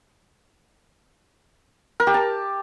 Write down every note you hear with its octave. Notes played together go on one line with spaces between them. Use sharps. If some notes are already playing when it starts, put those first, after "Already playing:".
A#4
G4
A5